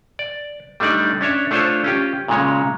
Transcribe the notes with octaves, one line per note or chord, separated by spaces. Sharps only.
D5
G3 A3 D4 D#4 D5
C#4 D4 C#5 E5
A3 D4 F4 A4 C5 C#5
C#4 F4 G4
A#2 C#3 G#3 C#5